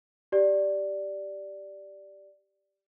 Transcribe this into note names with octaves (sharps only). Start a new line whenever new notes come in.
G4 D5